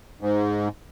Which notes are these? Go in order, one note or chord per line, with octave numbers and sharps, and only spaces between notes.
G#2